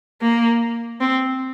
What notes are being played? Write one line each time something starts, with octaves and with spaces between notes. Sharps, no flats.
A#3
C4